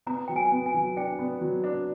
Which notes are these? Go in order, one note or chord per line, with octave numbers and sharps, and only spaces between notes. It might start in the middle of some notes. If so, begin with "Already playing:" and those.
B3 A#5
F#3 G5
G#5
B3
G#5
F#3
D4 G5
B3
F#3
D4